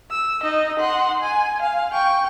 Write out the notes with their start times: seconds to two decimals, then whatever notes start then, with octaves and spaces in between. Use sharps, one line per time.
0.11 E6
0.43 D#4 D#5
0.80 F#5 C6
1.22 G#5
1.62 F5
1.93 G5 C#6